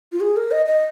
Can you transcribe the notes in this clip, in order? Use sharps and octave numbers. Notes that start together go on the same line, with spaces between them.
F4
G#4
A#4
D#5
D#5